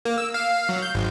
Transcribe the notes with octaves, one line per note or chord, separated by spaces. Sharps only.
A#3
E6
F5
F5
F#3
G6
G#1